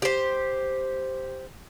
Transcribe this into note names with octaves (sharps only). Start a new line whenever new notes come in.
G4 C5